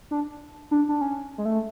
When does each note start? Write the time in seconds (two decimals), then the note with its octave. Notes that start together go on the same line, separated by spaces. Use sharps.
0.11 D4
0.71 D4
0.89 D4
1.01 C#4
1.38 G#3
1.45 A3